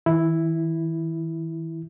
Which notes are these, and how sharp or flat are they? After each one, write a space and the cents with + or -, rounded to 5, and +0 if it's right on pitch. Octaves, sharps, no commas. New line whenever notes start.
E3 -45 E4 +0